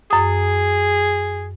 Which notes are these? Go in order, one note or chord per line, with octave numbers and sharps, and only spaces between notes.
F#2 G#4 D#6